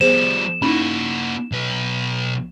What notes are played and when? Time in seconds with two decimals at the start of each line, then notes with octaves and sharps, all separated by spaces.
0.01 F3 G3 B3 G#4 C5 E7
0.62 A#3 C#4 D#4 E4 F#4
1.52 B1 B4